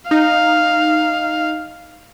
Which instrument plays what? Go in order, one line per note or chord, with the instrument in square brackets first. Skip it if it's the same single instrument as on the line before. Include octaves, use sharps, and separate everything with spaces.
[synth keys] D#4 [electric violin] F5